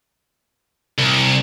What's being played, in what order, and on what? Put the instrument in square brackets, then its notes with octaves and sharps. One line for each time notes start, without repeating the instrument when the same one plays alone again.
[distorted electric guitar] C2